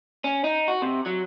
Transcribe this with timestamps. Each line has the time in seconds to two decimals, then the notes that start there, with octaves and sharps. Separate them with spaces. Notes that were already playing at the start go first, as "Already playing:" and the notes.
0.24 C#4
0.44 D#4
0.68 F#4
0.82 C3
1.06 F#3